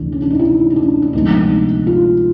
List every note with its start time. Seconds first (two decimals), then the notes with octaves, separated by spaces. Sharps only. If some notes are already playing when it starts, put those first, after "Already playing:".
Already playing: D2 C3 E3 A3 D4
0.12 C#4
0.22 D4
0.30 D#4
0.39 E4
0.72 C#4
0.76 D4
1.02 D4
1.13 D2 C3 F3 G#3 B3 D#4
1.87 F4